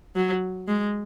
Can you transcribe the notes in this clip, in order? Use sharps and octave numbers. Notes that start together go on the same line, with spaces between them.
F#3
G#3